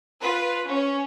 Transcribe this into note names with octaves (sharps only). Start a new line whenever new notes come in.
F4 B4
C#4